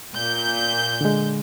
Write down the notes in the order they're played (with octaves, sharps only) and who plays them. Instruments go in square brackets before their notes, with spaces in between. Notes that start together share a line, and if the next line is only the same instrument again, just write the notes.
[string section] A#2 G6
[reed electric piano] D3 G#3